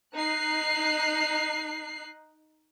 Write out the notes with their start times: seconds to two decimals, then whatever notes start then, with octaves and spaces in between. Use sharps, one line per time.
0.14 D#4 F#6 C7